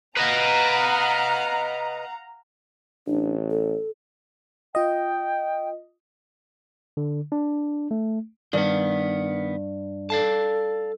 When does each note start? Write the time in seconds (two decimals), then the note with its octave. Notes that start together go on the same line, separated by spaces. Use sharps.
0.17 B4 D#5 F5 F#5 A#5
3.07 A1 D4
3.50 A4
4.75 F4 D#5 G5
6.97 D3
7.32 D4
7.91 A3
8.53 G2 D#3 B3
10.10 A4 D5 F5 A5